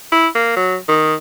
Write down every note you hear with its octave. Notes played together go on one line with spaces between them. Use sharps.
E4
A#3
F#3
D#3